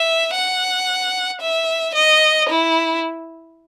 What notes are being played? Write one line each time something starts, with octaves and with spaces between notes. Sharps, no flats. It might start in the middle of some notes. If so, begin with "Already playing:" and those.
Already playing: E5
F#5
E5
D#5
E4